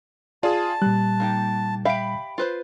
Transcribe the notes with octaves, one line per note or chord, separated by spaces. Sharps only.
F4 G#4 D5 A5
A#2 G3 F#6
A#3 D#4 G4
G4 E5 F5 B5 D7
F4 B4 C5